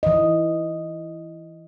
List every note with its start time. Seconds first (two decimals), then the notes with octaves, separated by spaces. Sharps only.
0.03 E3 D#5